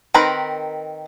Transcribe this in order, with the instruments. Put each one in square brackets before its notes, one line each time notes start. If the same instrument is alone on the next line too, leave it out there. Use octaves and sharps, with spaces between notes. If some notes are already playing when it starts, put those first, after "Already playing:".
[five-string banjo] D#3 C4 A#4 B4 B5